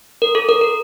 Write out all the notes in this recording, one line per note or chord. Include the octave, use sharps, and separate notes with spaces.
A#4
A4
A#4
A#4